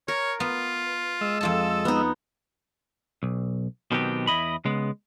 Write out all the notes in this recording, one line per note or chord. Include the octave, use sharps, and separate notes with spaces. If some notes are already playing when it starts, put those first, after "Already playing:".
A#4 C#5
B3 F4
G#3 D#5 E6
F2 F4 A4 A5
B3 D#4
B1
B2 D#3 F#3 B3 C4 G4
E2 E4 D#5 B5
C#3 G#3 B3